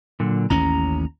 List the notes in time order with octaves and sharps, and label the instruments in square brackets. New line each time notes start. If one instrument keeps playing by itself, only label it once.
[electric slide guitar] A#2 D3 F#3
[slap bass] A1 D#2 C#4 [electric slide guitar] A#5